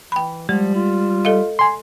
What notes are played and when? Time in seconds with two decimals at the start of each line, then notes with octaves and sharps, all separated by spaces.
0.12 E3 G5 B5
0.49 F3 G3 G#3
0.75 F4
1.25 A4 D#5 F5
1.59 G#5 C6